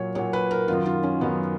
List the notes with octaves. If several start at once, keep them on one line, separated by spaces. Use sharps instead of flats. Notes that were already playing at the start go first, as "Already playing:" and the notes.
Already playing: A#2 F#3 C#5
A#2 F#3 C#5
B4
A#4
F#2 D#3 F#3 F4
F4
C#4
F#2 D#3 F#3 B3